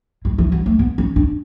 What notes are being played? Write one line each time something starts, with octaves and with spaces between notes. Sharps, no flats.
G#3
E3
F#3
A3
B3
C#4
D4